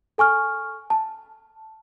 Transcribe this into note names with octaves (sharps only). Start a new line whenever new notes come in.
A4 G#5 C#6 F6
A5